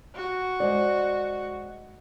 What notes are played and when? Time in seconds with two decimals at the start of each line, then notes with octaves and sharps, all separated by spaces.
0.15 F#4
0.60 G#3 C5 D5